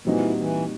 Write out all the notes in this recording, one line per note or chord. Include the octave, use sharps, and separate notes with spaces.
A#2 E3 G3 C4 D#4 F#4
E3